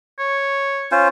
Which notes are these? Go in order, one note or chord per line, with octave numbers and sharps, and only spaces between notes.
C#5
C#4 F4 C5